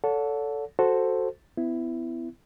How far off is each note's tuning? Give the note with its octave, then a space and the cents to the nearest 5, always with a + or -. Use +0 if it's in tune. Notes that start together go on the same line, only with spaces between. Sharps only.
A4 +0 C#5 +45 F#5 -35
F#4 +0 A4 +0 C5 +0
B3 +40 E4 +10